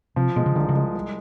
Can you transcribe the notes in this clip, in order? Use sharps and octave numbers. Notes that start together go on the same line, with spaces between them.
C3 F3
B2 G#3
C#3
C2 D3
C#3
G#3
C2